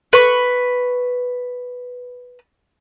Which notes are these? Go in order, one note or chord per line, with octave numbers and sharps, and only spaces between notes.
B4 C#6